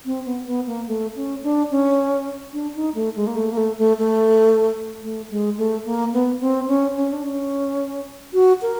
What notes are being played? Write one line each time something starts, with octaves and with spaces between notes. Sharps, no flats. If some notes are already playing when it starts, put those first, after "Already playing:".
C4
B3
B3
A#3
A3
C#4
D4
C#4
D4
D#4
A3
G#3
A#3
A3
A#3
A3
A3
A3
A3
G#3
A3
A#3
B3
C4
C#4
C#4
D4
C#4
F#4
A#4